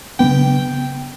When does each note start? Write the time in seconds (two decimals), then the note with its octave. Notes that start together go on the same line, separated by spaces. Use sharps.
0.19 C#3 F#3 B3 D4 G5